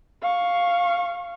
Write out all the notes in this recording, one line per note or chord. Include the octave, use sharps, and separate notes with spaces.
F5 C#6